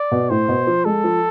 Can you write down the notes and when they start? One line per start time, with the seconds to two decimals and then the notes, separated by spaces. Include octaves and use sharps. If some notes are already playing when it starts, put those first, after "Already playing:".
Already playing: D5
0.12 B2
0.30 A2 C5
0.48 B2
0.67 F3
0.85 G#3 A4
1.04 F3